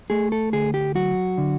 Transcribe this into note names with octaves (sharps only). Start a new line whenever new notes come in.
A3 G#4
A4
D2 G#4
G4
F#3 F#4
D3